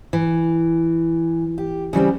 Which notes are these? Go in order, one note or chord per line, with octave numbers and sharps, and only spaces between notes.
E3
G4
C#3 E3 G3 C4